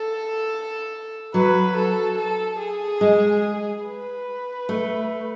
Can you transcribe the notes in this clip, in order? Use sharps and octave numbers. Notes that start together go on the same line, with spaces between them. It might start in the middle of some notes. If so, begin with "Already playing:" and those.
Already playing: A4
F#3 B4
A4
A4
G#4
G#3
B4
A3